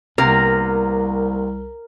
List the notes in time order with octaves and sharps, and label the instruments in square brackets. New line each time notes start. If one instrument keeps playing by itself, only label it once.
[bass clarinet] C2 [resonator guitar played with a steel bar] C3 A#3 B3 [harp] A#4